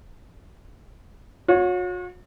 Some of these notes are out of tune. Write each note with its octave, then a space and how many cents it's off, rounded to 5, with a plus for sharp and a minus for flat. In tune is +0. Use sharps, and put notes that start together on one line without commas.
F#4 -45 C#5 +0